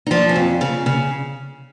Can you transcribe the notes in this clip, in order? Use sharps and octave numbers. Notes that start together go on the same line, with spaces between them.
D#4
F3 D4
C#4
F2
C#3
C#3